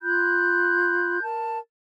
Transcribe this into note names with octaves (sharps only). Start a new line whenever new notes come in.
F4 B5 F#6 G6
A#4 A5